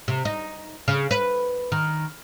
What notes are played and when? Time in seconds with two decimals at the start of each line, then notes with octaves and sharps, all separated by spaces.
0.08 C3
0.25 D#4
0.88 C#3
1.11 B4
1.72 D#3